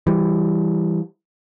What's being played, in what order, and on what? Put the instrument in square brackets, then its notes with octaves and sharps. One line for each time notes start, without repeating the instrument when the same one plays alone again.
[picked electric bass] E3 G3